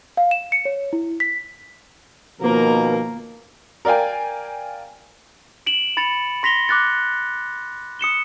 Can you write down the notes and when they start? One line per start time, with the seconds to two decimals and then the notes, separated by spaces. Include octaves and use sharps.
0.17 F5
0.31 E7
0.52 C#7
0.65 C#5
0.93 E4
1.20 B6
2.40 B2 D#3 F3 A#3 A#4
3.85 A#4 D5 F5 G5 G#5
5.67 D7 E7 F#7
5.97 B5 A6 C#7 F7
6.43 C6 A#6 B6 F7 G7
6.68 D6 F#6 A6 C#7
7.99 D#6 C#7 E7 G7